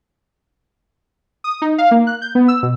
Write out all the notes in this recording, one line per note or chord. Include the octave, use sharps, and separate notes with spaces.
D#6
D#4
F5
A#3
F#6
G6
B3
E6
B2